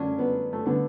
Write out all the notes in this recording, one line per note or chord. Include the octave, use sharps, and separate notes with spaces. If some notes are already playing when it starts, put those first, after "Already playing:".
Already playing: F#2 D3 C#4 D4
B3
A3
D3 B3